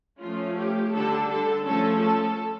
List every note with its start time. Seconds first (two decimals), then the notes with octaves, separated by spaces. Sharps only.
0.20 F3 A3 C#4 F4
0.56 G4
0.92 D3 G3 D4 A4
1.29 A4
1.64 F3 A3 C#4 A4
2.01 A4